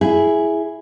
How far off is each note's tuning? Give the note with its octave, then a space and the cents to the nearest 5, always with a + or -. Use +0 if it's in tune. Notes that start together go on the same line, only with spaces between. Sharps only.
E4 +0 G#4 +0